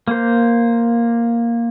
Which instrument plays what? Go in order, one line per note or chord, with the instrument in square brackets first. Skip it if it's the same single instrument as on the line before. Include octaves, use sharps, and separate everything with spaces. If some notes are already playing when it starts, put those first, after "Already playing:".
[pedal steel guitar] A#3 C5